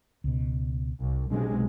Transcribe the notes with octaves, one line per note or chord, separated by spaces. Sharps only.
C#2 B2
C2
B1 C3 G#3 D4